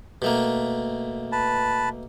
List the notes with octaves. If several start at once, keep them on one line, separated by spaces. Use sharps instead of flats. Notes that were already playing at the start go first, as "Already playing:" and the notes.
B2 A3 A#3
B4 A5